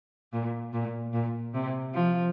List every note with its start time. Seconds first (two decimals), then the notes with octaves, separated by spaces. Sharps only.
0.33 A#2
0.73 A#2
1.13 A#2
1.54 C3
1.94 F3